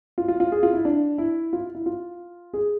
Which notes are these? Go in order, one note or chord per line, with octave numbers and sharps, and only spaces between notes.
F4
F4
F4
G#4
F4
E4
D4
E4
F4
E4
F4
G#4